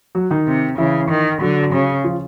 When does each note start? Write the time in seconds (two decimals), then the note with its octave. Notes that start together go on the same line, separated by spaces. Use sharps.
0.15 F#3 F#4
0.31 D#3 D#4
0.47 C3
0.78 C#3 E3 E4
1.10 D#3
1.41 D3 F#3 F#4
1.73 C#3
2.04 F3 F4